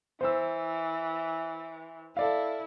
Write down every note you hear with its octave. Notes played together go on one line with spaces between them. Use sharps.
E3 C5 E6
E4 A4 D5 F5